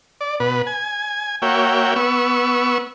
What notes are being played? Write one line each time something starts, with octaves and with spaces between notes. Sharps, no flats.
D5
B2 B4
G#5
A#3 F#4 C#5 E5 G5
B3 C#6 E6